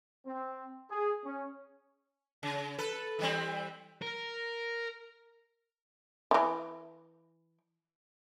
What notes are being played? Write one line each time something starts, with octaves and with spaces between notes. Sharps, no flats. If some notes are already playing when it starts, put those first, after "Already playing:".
C4
G#4
C#4
C#3
A4 B4
E3 G3 C4
A#4
D#3 E3